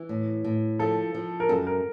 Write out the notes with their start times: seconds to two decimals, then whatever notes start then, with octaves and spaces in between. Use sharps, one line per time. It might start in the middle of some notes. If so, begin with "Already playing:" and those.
Already playing: E3
0.09 A2
0.44 A2
0.79 F3 A4
1.14 F3
1.40 A#4
1.49 F#2 A4
1.67 A#4